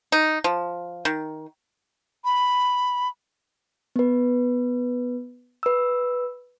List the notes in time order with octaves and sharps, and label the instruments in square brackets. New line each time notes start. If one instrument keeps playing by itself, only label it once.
[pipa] D#4
F3
D#3
[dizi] B5
[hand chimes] B3 B4
B4 E6